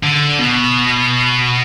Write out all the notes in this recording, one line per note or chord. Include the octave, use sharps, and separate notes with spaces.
D3
B2